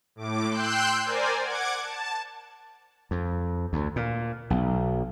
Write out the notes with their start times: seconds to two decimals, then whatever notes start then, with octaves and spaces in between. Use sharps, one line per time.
0.15 A2 D6
0.49 G5 C6 E6 F#6 G6
1.02 A#4 C5 D5 G#5
1.43 F#5 D6 G#6
1.82 A5
3.11 F2
3.73 D2
3.96 A#2
4.50 B1